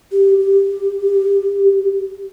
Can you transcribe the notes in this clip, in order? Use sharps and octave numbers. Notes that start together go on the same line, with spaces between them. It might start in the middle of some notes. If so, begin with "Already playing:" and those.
G4
G4